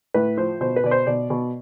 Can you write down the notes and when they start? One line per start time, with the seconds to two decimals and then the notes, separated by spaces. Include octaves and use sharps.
0.14 A2 B4
0.37 F3 C5
0.61 B2 C5
0.76 B4
0.84 B2 D5
0.91 C5
1.07 B2 D5
1.30 B2